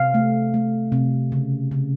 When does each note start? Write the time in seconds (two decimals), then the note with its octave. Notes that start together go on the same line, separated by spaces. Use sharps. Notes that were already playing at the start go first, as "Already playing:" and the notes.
Already playing: C3 F5
0.14 A3
0.54 A3
0.92 C3
1.32 C#3
1.71 C#3